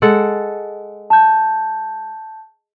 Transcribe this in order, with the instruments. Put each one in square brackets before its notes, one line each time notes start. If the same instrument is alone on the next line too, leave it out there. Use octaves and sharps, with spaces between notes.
[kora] G#3 A4 F#5
[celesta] A5 G6